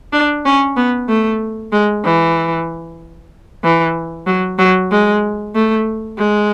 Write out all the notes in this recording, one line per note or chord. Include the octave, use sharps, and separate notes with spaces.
D4
C#4
B3
A3
G#3
E3
E3
F#3
F#3
G#3
A3
G#3